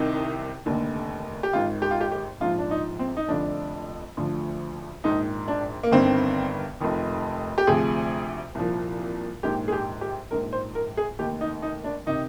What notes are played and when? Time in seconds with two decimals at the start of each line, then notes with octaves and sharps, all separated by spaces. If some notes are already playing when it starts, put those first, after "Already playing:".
Already playing: C2 C3 D#3 D#4
0.66 F1 D#2 D3
1.43 G4
1.53 G#1 G#2 D#3 F4
1.82 G4
1.91 F4
2.01 G4
2.12 G4
2.40 A#1 G#2 F3 F4
2.58 D4
2.71 D#4
2.99 C4
3.17 D#4
3.28 F1 F2 D3 F3 D4
4.17 D2 D3 F3
5.04 A#1 G#2 D#3 D#4
5.48 D4
5.83 A#3
5.92 G1 G2 D#3 C4
6.80 F1 F2 D#3
7.58 G4
7.67 D2 C3 F3 G#4
8.55 C2 A#2 F3
9.43 A#1 G#2 D#3 G4
9.68 G#4
9.72 G4
10.01 G4
10.31 A#1 G#2 D#3 A#4
10.53 C5
10.75 A#4
10.97 G#4
11.19 F1 D#2 D#3 G4
11.41 D#4
11.62 D#4
11.84 D4
12.06 C3 D#3 D#4